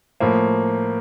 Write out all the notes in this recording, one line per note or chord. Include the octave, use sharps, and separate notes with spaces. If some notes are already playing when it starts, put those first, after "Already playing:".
A2 F3 A#3